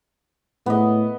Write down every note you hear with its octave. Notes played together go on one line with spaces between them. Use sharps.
A2 B3 D#5